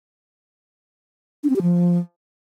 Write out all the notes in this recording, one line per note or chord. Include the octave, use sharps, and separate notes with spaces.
D4
C4
G4
F3